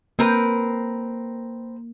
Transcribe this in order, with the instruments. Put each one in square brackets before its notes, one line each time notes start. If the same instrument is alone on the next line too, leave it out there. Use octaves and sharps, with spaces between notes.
[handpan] A#3 [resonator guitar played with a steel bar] C4 A#4 B4